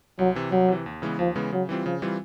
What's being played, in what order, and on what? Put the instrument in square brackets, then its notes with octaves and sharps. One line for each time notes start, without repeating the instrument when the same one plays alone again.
[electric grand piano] C2 [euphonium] F#3
[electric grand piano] C3 E3
[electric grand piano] C2 [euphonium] F#3
[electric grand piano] C3 E3
D#2
C#3 E3 G#3 B3
[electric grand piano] D#2 [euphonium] F3
[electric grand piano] C#3 E3 G#3 B3
[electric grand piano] C#3 [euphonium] F#3
[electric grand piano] E3 G3 C4 F4
[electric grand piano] C#3 [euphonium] F3
[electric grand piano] E3 G3 C4 F4